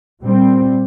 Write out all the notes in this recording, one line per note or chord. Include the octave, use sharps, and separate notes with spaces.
A#2 G3 C4